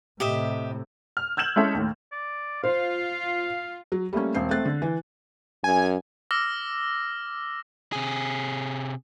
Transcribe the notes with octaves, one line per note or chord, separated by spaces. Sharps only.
A2 C3 G4 D#5 E5
F6
E6 G6 G#6 E7 F#7
G#3 C#4 E4 A4 E5
D#2 A2
D5
F4 C5 F5
F#3
G3 A3 A#3 C#4
E1 C4 C7
A3 C4 F#6 A6
D3
E3
F#2 G#5
D6 E6 F6 A#6
C3 G#4